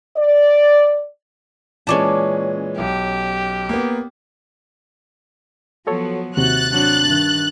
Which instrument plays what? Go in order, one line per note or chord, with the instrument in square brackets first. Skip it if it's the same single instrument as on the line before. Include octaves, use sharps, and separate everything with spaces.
[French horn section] D5
[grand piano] A#2 E3 G#3 [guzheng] C#4 D5 A5
[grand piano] B1 [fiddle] G4
[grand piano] A#3 B3
[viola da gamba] F3 F#3 B3 [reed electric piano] F#4 A4 C#5
[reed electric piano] D#2 C3 [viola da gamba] F#4 [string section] F#6 A6
[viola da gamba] F#3 C4 D4
G2 D#3